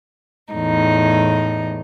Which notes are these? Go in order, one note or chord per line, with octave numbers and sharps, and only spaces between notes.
E2 A2 D#4